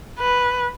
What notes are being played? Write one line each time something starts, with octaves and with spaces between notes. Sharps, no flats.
B4